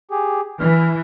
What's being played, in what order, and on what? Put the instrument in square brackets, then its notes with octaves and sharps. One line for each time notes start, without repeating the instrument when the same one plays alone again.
[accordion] G4 G#4
[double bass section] E3 [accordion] F6